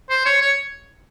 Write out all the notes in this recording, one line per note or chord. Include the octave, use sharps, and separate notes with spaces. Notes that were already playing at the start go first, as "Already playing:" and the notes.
C5
C#5
C#5